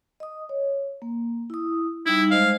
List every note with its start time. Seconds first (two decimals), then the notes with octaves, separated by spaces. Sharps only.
0.20 D#5 D#6
0.49 C#5
1.02 A#3
1.50 E4 D#6
2.06 G3 D#4 E4
2.31 G#3 C5 D#5 F5